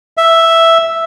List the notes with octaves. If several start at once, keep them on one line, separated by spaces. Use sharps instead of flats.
E5